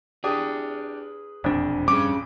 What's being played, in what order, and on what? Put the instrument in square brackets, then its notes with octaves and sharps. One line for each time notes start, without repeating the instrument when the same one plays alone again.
[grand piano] D4 G4 D#6 [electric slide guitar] G#4 B4
[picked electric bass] E1 D4 [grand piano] A#1 F2
[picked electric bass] G2 [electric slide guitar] C#4 G#4 [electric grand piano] D6